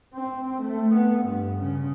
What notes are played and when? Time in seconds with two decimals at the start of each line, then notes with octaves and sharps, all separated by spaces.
0.14 C4
0.62 A3
0.95 B3
1.25 G2
1.57 C#3